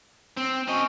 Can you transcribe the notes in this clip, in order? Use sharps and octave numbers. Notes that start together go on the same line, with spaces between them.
C4
C4 C#4 D#5